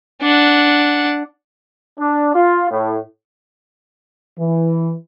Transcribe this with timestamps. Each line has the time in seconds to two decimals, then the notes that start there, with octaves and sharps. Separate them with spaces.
0.22 D4 F#5
1.97 D4
2.34 F4
2.70 A2
4.39 E3